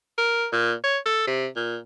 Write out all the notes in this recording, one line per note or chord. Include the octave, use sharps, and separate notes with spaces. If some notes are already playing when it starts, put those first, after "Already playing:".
A#4
A#2
C#5
A4
C3
A#2